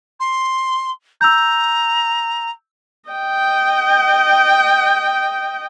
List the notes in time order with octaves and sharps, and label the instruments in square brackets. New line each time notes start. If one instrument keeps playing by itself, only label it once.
[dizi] C6
[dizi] A#5 [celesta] E6 G6
[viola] D#5 G5